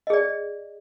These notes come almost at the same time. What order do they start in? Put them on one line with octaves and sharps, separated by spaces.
D#5 G#4 D5